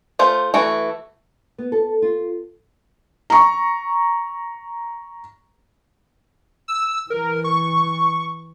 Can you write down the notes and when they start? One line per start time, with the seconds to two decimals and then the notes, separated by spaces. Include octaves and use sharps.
0.19 A3 F4 C5
0.54 E3 A3 F#4
1.58 B3
1.72 A4
2.02 F4
3.30 A#5 C#6
6.68 E6
7.10 E3 A#4
7.44 C#6